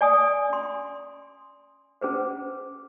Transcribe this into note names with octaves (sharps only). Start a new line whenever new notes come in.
D5 G#5 D#6
C#4 C6
C#4 G#4 B4 C5